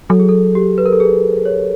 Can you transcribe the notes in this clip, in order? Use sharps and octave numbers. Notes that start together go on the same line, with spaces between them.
F#3 A4
G#4
A4
G4
B4
A#4
A4
G#4
C#5